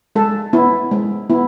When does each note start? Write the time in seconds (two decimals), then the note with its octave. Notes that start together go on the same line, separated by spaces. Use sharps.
0.16 G#3 A4
0.53 B3 E4
0.91 G#3
1.30 B3 E4